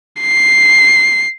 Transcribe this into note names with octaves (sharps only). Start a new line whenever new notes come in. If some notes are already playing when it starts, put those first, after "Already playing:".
C7